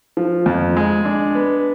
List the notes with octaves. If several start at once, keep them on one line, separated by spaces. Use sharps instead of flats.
F3
F2
G#3
D4
B3